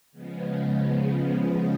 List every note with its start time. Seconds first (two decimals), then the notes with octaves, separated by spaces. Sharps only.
0.12 C#3 F3 G#3 B3
0.85 C#3 F3 G#3 B3